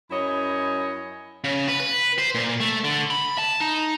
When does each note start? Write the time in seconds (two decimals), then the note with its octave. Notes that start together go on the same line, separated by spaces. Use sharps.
0.11 F#2 E4 C#5 D#5 G#5 B5
1.44 C#3
1.68 B4
1.80 B4
2.18 C5
2.35 A#2
2.60 A3
2.84 D3
3.10 B5
3.38 A5
3.60 D#4